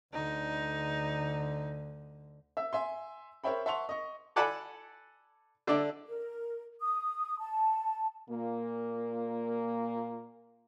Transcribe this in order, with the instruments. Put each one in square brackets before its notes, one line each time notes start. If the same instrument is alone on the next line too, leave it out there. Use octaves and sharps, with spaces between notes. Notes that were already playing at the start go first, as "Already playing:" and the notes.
[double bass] D2 D3 [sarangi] D#4
[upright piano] E5 E6
E5 G#5 C6
A#4 C5 C#5 E5 G5 B5
E5 F#5 A5 C6 C#6 F7
D#5 C#6
[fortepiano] A4 D5 F#5 G#5 A5 B5
D3 D5 E5
[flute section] A#4
D#6
A5
[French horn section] A#2 A#3